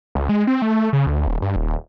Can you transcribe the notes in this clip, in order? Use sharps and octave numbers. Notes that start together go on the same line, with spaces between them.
C#2
G#3
C4
A3
C#3
D2
D#1
G2
D#1